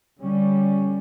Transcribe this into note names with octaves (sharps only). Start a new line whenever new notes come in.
D3 G3 C#4